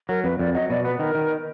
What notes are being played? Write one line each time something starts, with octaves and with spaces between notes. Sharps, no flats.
F#3 A#4
F2 B4
F2 D5
F#3 D#5
B2 D5
B3 B4
D#3 A#4
D#3